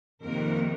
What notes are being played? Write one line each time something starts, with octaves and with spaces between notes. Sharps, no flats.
F2 C3 D#3 A#3 A#4